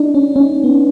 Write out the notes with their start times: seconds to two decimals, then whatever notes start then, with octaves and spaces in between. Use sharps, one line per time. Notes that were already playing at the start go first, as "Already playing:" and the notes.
Already playing: D4 D#4
0.14 C#4
0.36 C#4
0.64 B3